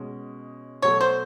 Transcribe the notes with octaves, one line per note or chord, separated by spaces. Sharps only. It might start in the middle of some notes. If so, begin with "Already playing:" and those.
Already playing: B2 G#3 C#4
B2 F#3 A3 C#5
C5